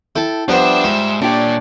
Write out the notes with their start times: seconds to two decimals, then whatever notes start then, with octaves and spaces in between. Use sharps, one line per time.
0.16 E4 A4 G5 A5
0.48 F3 G3 B3 D4 C5 E5
0.84 G#2 F4
1.22 A#2 D4 G4 C#5 D5